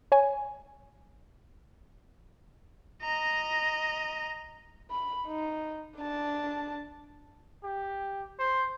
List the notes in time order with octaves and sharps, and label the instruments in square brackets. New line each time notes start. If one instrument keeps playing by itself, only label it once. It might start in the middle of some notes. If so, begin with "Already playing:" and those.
[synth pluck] C#5 G#5
[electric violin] D#5 A#5
[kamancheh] B5
D#4
D4 A5
[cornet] G4
C5